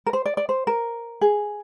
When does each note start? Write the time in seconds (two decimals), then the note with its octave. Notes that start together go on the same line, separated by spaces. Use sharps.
0.06 A#4
0.13 C5
0.26 D5
0.37 D5
0.49 C5
0.67 A#4
1.21 G#4